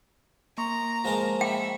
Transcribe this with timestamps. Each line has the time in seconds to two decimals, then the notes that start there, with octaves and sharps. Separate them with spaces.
0.58 A#3 A#5 C6 C#6
1.04 F3 G#3 A#4
1.41 E5 G5 B5